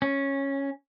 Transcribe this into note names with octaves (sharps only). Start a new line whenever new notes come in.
C#4